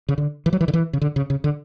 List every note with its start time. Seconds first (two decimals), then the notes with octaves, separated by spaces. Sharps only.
0.09 C#3
0.18 D3
0.46 E3
0.53 F#3
0.61 E3
0.68 D3
0.73 E3
0.93 C#3
1.01 D3
1.16 C#3
1.30 C#3
1.44 D3